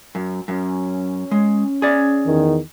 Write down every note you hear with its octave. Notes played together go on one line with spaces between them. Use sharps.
F#2
F#2 C#4
G#3
G#4 D5
E2 D#3